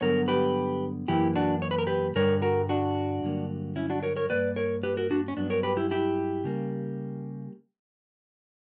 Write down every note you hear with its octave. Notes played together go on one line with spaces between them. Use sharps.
G2 D3 F#3 B3 A#4 C#5
G4 B4
F#2 E3 A#3 E4 G4
D4 F#4
C#5
B4
A#4
G4 B4
G2 D3 G3 A#4 C#5
F#4 A#4
D4 F#4
G2 D3 F#3 A#3
C#4 E4
D4 F#4
A#4 C#5
A#4 C#5
G2 E3 A#3 B4 D5
A#4 C#5
G4 B4
F#4 A#4
D4 F#4
C#4
G2 F#3 B3 D4
A#4 C#5
G4 B4
E4 G4
E4 G4
C#3 G3 A#3